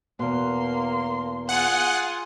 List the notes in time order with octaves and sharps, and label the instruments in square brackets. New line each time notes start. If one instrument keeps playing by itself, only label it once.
[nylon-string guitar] E2 B2 [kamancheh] A#3 C6
[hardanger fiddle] F4 G#4 [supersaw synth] F#5